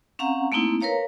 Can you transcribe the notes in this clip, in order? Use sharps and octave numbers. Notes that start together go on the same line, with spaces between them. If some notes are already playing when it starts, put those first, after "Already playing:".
C4 C#4 F5 F#5 A#5
A3 A#3 C4 D#4 E4
A#4 B4 C#5 F5 A#5